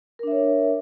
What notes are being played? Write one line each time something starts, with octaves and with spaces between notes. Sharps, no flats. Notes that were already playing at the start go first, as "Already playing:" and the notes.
D4 A#4 C#5 E5